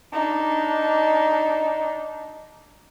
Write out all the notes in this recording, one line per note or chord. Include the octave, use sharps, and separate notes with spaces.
D4 D#4